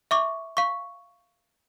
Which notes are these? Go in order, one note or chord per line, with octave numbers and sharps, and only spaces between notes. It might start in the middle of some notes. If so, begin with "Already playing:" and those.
E5 C#6 D6
F5 C#6